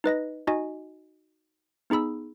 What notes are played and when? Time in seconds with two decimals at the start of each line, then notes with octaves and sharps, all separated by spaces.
0.04 D#4 B4 D#5 A#6
0.47 D#4 F#4 D#5 G#5
1.90 B3 D#4 G#4 B5 E6